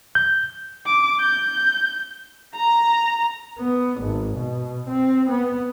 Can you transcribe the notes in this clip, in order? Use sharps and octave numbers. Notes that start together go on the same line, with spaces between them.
G6
D6
G6
A#5
B3
G#1
B2
C4
B3